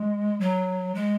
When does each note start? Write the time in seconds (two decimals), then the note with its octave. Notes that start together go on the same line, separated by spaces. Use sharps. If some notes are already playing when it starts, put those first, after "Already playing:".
Already playing: G#3
0.40 F#3
0.95 G#3